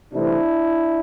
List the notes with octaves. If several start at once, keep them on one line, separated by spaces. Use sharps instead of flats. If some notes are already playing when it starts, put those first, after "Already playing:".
C3 E3 A3 C4 D4 E4